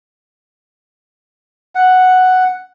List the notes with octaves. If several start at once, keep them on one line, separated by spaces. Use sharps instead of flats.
F#5